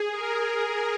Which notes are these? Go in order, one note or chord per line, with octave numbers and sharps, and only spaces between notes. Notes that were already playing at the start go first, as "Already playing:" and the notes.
Already playing: G#4
A#4
A#4